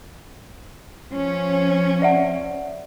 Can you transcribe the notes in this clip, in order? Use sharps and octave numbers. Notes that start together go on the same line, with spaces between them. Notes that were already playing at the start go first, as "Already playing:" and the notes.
F3 C#4
D5 E5 F#5